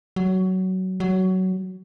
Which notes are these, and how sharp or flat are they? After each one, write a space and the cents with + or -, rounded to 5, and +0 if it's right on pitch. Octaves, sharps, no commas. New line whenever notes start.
F#3 +15
F#3 +15